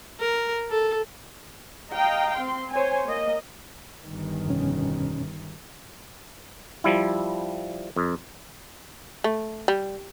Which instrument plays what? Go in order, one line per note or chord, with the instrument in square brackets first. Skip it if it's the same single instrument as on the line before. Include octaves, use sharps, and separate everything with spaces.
[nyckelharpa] A#4
A4
[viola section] D#5 F5 G5 A#5
C4 C6
C5 C#5 G#5
A#3 D#5
[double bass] G1 D#3
[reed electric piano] F2 B2 C#4
[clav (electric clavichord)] F3 G3 E4
F2
[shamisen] A3
G3